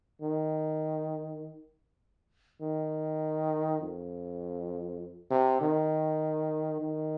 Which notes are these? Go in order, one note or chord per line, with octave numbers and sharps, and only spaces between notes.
D#3
D#3
F2
C3
D#3
D#3